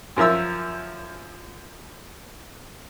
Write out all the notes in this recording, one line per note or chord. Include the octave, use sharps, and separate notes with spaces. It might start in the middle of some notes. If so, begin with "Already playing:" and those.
F#2 F3 A#4 E5 E6